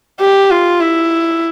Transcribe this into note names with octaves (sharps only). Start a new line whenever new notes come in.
G4
F4
E4